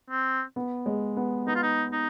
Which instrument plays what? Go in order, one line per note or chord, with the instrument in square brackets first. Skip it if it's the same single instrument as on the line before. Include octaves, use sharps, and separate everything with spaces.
[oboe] C4
[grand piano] B3
G#3
B3
[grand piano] B3 [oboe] D#4
[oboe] F4
D#4
D#4